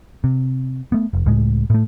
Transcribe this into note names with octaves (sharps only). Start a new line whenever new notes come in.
C3
A3 B3
F1
C#2 A2 G#3
A2 A3